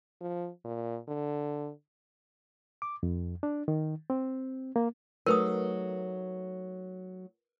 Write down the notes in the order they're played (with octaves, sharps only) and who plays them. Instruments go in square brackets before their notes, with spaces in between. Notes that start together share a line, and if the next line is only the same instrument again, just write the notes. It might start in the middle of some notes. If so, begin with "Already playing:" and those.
[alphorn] F3
A#2
D3
[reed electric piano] D6
F2
D4
D#3
C4
A#3
[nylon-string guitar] F#3 A3 D#4 [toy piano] A#4 B4 D#6